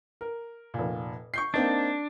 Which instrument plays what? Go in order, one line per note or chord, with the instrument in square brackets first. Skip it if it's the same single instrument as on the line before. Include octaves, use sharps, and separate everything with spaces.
[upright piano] A#4
F1 A#2
C#6 G6 C7
[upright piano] A#3 C4 D#4 [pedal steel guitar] D4